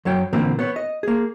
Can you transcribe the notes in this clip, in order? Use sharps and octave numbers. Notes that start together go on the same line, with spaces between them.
F#2 F#3 C#5 G5
A#2 D3 E3 A#3 C4
B3 C#5
D#5
A#3 G#4